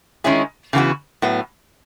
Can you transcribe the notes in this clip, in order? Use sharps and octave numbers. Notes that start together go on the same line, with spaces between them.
D#3 G#3 C#4 E4 G#4
C#3 E3 B3 F#4
A2 F#3 B3